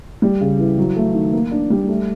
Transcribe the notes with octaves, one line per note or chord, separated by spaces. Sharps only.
G3
C#3
E3
F#3
A3
D#3
A#3
D4
G3
A3